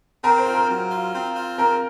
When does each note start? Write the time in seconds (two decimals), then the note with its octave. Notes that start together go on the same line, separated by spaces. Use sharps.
0.24 C4 A#4
0.38 C5
0.46 F4
0.53 A#4
0.69 F#3
0.91 F4
1.13 C4
1.36 F4
1.58 C4 A#4